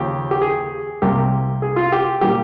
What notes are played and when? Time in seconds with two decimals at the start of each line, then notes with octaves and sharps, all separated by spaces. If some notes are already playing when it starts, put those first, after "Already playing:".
Already playing: D#2 C#3 F3 G4
0.31 G4
0.41 G#4
1.02 C2 C3 G3 A#3 G4
1.62 G#4
1.76 F4
1.92 G4
2.21 A#2 G3 A#3 G4